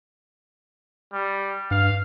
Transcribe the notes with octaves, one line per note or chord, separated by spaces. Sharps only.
G3
G2 F5